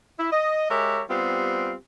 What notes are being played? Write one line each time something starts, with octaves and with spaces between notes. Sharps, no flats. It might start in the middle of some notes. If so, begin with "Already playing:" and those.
E4
D#5
G#3 G4 A#4 C#5 E5
G3 B3 C4 F4 G4